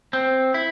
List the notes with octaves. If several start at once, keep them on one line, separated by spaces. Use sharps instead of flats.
C4
E4